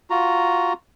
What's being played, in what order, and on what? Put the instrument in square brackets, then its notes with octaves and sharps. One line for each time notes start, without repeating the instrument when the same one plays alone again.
[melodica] F4 F#4 A#5